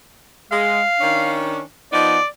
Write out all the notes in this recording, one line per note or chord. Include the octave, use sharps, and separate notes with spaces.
G#3 F5
D#3 C#4 D4
F3 B3 D#4 D5